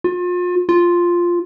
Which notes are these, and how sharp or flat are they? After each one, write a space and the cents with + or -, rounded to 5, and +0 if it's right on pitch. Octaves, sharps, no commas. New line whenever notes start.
F4 +35
F4 +0